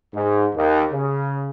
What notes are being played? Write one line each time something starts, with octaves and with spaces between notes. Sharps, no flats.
G#2
D#2
C#3